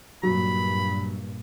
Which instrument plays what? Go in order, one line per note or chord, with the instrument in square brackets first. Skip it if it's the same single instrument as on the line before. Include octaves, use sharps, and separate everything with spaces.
[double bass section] G2 A#2 [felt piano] F#3 [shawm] B5